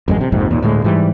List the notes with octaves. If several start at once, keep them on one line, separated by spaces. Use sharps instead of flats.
A1 F#2 G3 G#3
C3
A#1 F2 G#2 C3
D#2 A#2
D2 A2 F#3 G#3
G#2 E3 G3